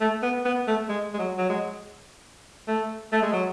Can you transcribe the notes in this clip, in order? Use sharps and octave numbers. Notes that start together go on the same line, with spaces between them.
A3
B3
B3
A3
G#3
G#3
F#3
F#3
G#3
A3
A3
G#3
F#3